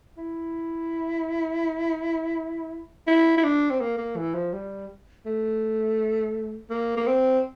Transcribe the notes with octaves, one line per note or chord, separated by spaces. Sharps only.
E4
E4
E4
D4
C4
A#3
A#3
E3
F3
G3
A3
A#3
A#3
C4